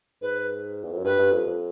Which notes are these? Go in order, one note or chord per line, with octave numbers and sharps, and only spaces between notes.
G#2 B4
E2
F2
F#2
G2 B4
G2
F2
F2